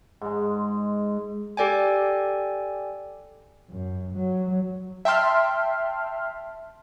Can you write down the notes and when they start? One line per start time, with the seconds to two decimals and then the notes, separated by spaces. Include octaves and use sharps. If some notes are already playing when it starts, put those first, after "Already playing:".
0.21 G#2 G#3
1.57 G4 A4 D5 G5 G#5
3.70 F#2
4.15 F#3
5.05 E5 G5 A5 C6 F6